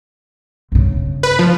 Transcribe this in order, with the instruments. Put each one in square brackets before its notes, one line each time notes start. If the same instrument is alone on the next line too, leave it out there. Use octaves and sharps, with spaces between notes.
[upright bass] G1 C#3
[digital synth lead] B4
F3